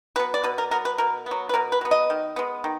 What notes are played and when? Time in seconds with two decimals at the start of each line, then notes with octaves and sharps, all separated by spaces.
0.16 F#3 B3 B4
0.34 D5
0.43 B2 B4
0.58 A#4
0.71 F#3 B3 A#4
0.85 B4
0.98 B2 A#4
1.26 F#3 B3
1.49 B4
1.54 B2 A#4
1.72 B4
1.81 F#3 B3
1.91 D#5
2.10 D#3
2.36 G#3 B3
2.64 D#3